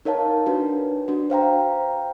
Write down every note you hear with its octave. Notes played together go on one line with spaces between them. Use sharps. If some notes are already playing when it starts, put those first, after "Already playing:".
D#4 A#4 C#5 F5 A5
D4 F#4 B4
D4 F#4
C5 F5 G5 A#5